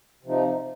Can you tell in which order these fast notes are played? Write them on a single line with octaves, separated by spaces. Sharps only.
C3 F3 D#4